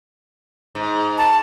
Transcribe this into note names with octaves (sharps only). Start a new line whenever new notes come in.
G#2
A5